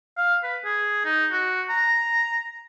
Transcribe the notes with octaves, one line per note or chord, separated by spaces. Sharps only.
F5
B4
G#4
D#4
F#4
A#5